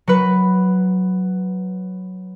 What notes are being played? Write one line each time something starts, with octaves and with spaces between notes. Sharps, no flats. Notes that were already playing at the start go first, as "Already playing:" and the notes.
F#3 B4